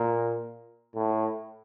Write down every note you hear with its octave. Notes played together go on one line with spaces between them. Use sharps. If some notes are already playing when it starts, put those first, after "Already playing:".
Already playing: A#2
A2